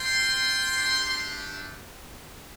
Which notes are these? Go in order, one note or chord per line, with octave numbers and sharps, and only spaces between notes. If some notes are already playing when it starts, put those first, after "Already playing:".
Already playing: C4 F4 G5 C6
A3 D4 G4